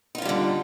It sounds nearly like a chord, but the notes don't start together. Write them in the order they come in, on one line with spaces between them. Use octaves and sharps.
D#4 F4 D#3 G3 D3